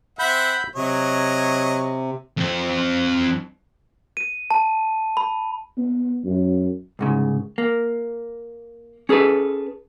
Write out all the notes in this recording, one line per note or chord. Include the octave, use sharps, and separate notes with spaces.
C4 E5 F#5 B5 G6
C3 F#3 C#5 D#5
F2 C4
D#7
A5
B5
B3
F#2
C2 G#2 C#3
A#3
C#4 G#4 A4 B4